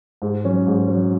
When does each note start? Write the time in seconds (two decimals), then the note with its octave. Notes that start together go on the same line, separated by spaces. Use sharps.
0.22 G#2
0.44 F#3 C#4
0.67 G#2
0.88 F#3 C#4